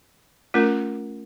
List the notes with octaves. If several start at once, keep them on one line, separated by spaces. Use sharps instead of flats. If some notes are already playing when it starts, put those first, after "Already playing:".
A3 C#4 F4 A#4